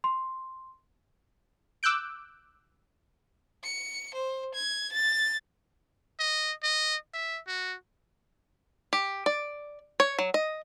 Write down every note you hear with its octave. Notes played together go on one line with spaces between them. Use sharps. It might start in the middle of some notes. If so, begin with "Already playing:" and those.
C6
D6 E6 F#6 G6 D7
C#7
C5
G#6
A6
D#5
D#5
E5
F#4
G4
D5
C#5
F#3
D#5